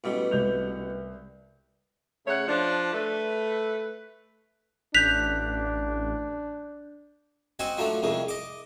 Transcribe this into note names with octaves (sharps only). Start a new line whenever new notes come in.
A1 B2 G3
C2 G6 F7
C#3 A3 C#5 F#5
F3 D4
A3 B4
A1 D4 F#6 G6 B6 F7
C4 F#4 D#5 G#5
F3 F#3 A3 D4
C2 F2 C3 G#3
D#5 D6